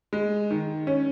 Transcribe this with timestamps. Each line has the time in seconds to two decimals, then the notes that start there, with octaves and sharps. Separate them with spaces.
0.13 G#3
0.50 D#3
0.87 C#4